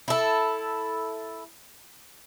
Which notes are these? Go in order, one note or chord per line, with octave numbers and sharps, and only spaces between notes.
E4 A4